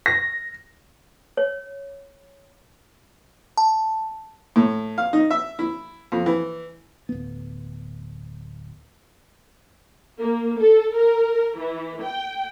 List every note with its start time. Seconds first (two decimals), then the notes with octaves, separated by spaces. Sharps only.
0.06 A#6
1.37 C#5
3.58 A5
4.56 A2
4.98 F5
5.13 D#4
5.30 E5
5.59 E4
6.12 F2
6.26 E3
7.09 D1 B3
10.19 A#3
10.59 A4
10.95 A#4
11.58 E3
12.03 G5